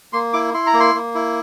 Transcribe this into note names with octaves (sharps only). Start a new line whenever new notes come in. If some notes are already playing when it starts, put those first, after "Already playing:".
A#3 C6
E4 D6
E4 C6
A#5
A#3
C6
A#3
E4